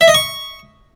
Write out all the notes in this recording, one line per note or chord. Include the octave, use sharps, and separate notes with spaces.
E5
D#5
C#6